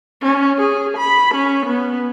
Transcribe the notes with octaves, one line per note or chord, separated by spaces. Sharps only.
C#4
G#4
B5
C#4
B3